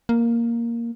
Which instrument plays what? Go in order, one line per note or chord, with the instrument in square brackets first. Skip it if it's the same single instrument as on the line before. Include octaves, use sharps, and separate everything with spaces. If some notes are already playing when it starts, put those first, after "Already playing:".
[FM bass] A#3